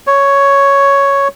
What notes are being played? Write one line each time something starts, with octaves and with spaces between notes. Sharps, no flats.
C#5